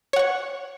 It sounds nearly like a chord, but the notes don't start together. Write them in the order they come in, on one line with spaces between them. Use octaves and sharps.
C#5 F#5 C#6